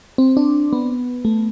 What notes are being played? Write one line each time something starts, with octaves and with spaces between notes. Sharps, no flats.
C4
D4
B3
A3